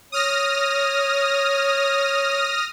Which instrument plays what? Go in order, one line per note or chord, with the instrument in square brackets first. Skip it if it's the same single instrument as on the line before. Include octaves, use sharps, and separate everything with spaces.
[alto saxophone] C#5 [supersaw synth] D#6 F6 A#6